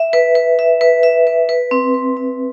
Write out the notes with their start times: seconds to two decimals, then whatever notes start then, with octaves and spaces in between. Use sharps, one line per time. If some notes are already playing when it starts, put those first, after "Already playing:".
Already playing: E5
0.13 B4
0.35 B4
0.59 E5
0.81 B4
1.03 E5
1.27 B4
1.49 B4
1.71 C4
1.94 B4
2.17 C4